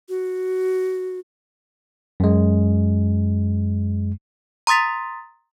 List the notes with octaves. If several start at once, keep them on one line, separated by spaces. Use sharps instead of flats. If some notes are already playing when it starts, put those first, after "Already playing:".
F#4
F#2 G#3
A#5 C6 D#6 A6 B6